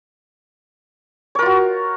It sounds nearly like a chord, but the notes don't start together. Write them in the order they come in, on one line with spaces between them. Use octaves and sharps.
C#5 A#4 F4 F#4